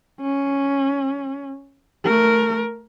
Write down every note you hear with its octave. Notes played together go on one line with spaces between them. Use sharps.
C#4
A3 A#4